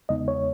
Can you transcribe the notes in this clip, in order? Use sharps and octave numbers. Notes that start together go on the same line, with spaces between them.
E2 C#3 G#3 B3 D#4 D#5
C#5